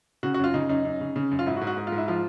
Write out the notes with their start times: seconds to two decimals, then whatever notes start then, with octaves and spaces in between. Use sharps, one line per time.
0.23 C#3 F#4
0.34 F#4
0.39 F#2 F4
0.54 C#3 D#4
0.69 F#2 D#4
0.85 F#2
1.01 C#3
1.16 C#3
1.31 F#2
1.39 F4
1.46 G#2 E4
1.57 F#4
1.61 G#2
1.67 F#4
1.77 G#2
1.87 F4
1.92 G#2
1.98 E4
2.08 F3 F4